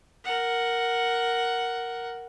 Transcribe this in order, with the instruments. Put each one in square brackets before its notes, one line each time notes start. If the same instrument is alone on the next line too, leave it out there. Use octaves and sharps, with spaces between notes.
[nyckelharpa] A#4 F#5